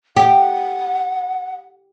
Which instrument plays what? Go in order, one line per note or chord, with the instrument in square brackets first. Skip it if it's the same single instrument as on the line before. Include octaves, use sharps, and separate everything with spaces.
[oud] G4 [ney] F#5